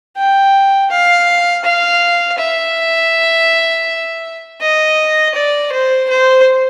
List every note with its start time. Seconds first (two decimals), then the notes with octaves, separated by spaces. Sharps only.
0.17 G5
0.90 F5
1.64 F5
2.39 E5
4.61 D#5
5.35 D5
5.72 C5
6.09 C5